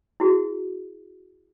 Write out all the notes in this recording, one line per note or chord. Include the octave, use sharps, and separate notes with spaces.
E4 F#4 G#4